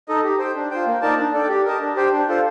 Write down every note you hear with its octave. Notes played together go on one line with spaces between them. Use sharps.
D#4 A4 D#5
G4
C5 G5
D4
F4 C5 G5
A#3
D#4 A#4 D5 A5
D4
A4 D5 G5
G4
A#4 D#5 A5
D4
G4 C5 G5
D4
F4 A4 C5